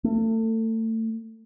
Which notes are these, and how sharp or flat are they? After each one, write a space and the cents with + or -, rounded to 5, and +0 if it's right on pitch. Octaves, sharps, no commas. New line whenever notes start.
A3 +30